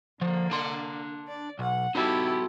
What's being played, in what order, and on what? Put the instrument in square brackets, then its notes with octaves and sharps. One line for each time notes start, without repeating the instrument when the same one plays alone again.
[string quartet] D3 A#3 [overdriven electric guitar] F3
[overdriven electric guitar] D4 C6
[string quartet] D5
[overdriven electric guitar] B1 [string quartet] F#5
[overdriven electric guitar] D#4 F#4 [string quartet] E4 G4 A4